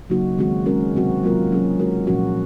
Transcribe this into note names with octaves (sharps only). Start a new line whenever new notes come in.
C#3 F#3 A#3 D#4 F#4
D#3 G#3 C4 F#4
G#3 C#4 F#4 A#4
C3 F#3 C4 F#4
F#3 A#3 F4 A#4
F#3 C#4 G#4
G#3 D#4 F#4 A#4
A#2 F3 G#3 C#4 F#4